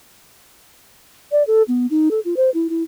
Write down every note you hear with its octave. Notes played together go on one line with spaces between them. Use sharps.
D5
A4
B3
D#4
A4
F4
C5
E4
E4